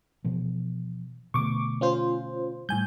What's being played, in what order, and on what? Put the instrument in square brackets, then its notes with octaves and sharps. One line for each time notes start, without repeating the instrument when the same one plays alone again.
[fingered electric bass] B2 E3 F3
[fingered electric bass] B2 D3 A3 [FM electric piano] C#6 D6
[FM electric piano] C#4 F4 C5
[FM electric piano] A2 G#5 G6 [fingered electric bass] G3